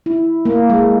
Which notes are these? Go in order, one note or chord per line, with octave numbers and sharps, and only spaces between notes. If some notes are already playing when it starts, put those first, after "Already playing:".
E4
A#3
G#3